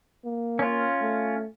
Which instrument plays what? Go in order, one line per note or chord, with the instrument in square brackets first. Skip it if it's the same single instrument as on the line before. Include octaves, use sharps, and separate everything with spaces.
[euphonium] A#3
[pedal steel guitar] C#4 F4
[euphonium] A3